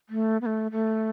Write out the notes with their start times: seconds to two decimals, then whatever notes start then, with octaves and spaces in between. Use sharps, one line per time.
0.09 A3
0.41 B3
0.46 A3
0.72 A3